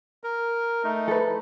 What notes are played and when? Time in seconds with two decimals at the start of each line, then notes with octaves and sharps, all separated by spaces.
0.24 A#4
0.84 A3 D#4
1.08 A4 B4